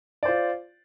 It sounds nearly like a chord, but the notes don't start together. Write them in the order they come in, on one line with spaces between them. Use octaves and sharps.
D5 C5 F4